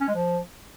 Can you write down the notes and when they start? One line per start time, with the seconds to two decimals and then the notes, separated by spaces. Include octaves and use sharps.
0.01 C#4
0.08 G#3
0.15 F3